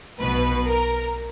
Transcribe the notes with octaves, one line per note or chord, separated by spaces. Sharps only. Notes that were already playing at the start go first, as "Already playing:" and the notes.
B1 B2 B4
A#4